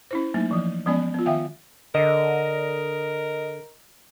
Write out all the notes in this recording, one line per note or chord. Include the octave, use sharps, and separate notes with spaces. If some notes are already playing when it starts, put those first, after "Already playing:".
C#4 E4 C5
F#3 A3 A#3 D#4
E3 F3
F3 G#3 B3 C#4 D5 G#5
B3 F4
D#3 E5 F5 G5 G#5
D3 A#4 D#5